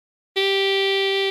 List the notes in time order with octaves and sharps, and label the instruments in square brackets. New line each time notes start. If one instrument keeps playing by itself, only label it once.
[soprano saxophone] G4